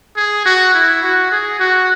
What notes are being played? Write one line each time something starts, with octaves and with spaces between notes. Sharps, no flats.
G#4
F#4
E4
F#4
G#4
F#4